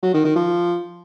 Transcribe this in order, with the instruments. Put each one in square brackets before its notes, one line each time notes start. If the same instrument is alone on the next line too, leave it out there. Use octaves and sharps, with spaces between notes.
[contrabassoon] F#3
D#3
D#3
F3